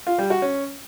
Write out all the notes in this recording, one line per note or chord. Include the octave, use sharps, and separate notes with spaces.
F4
G3
F#4
C#4